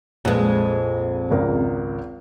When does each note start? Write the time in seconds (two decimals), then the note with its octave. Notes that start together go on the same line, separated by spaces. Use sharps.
0.25 A#1 F2 G#3 B4
1.31 G#1 C#2 A#4